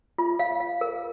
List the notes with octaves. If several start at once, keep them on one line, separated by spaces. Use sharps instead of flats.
F4
F5
F5
A#4